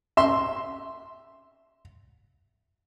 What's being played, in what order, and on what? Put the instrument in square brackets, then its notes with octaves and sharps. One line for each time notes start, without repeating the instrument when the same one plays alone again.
[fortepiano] E5 C6